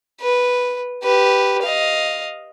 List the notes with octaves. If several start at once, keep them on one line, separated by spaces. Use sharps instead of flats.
B4
G4 B4
D#5 F5